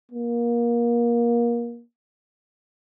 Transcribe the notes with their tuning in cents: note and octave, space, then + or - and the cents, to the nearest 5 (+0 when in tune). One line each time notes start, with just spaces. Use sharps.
A#3 +25